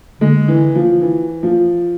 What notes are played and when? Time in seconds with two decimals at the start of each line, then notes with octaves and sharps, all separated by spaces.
0.20 D3 G#3
0.48 E3
0.75 F3
1.01 E3
1.43 F3